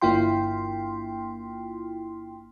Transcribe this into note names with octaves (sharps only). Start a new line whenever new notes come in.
G1 A#3 E4 F4 G5 C6